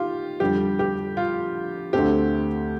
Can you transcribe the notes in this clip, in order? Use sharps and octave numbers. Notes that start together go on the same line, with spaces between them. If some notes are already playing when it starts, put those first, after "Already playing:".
Already playing: D#3 F4 G4
F2 D3 G3 G4
G4
F4
D2 D3 A3 C4 G4